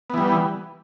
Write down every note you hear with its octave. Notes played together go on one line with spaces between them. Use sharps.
E3 G3 B3